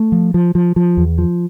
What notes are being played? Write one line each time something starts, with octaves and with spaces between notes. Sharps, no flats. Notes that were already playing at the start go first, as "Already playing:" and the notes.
Already playing: A3
F3
F3
F3
F3
E2
F3